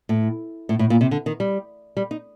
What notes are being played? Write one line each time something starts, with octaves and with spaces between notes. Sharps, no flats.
A2
A2
A2
A#2
C3
D3
D#3
G3
G3
D#4